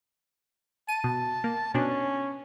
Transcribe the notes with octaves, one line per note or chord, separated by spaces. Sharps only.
A5 D#7
B2
A#3
B2 C#4 D4